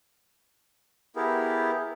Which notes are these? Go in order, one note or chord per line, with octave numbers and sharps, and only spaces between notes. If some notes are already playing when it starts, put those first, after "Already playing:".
B3 E4 G4 G#4 A#4